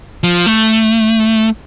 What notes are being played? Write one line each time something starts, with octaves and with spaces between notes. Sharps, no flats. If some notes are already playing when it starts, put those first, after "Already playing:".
F3
A3